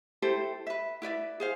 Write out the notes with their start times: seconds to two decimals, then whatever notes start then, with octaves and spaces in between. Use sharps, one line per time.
0.22 E4 G4 A4 C5
0.67 B4 E5
1.02 E4 B4 D5 E5
1.40 G#4 C5 F5